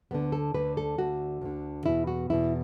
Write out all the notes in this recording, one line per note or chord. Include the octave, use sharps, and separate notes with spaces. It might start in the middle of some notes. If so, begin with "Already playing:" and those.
D2 D3 B3
A4
D2 D3 B4
A4
D2 D3 F#4
D2 D3
E2 B2 E4
F#4
E2 B2 E4